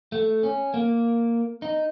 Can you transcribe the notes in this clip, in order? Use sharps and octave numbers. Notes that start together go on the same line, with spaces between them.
A3
C#4
A#3
D#4